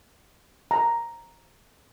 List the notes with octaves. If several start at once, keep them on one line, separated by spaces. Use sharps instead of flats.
A#5